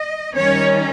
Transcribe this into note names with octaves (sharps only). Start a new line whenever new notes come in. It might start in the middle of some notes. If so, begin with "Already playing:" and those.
Already playing: D#5
D#3 G3 C#4 C#5